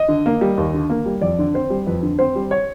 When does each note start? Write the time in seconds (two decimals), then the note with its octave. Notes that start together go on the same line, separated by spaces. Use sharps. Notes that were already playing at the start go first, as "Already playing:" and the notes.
Already playing: D#5
0.09 D3
0.26 A#3
0.41 G3
0.58 D#2
0.74 D3
0.90 A#3
1.06 G3
1.21 F2 D5
1.39 D3
1.54 C4 C5
1.70 G3
1.87 F2 B4
2.03 D3
2.19 C4 C5
2.36 G3
2.51 C#5